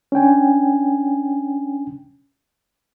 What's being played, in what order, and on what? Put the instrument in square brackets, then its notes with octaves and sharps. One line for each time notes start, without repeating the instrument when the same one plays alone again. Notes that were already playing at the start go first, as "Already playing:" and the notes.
[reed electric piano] C#4 D4 G5 G#5